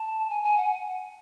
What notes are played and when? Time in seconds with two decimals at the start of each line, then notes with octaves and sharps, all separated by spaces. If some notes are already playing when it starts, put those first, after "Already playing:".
Already playing: A5
0.30 G#5
0.44 G#5
0.57 F#5